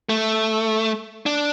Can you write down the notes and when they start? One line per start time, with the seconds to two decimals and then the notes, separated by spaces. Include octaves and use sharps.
0.09 A3
1.26 D4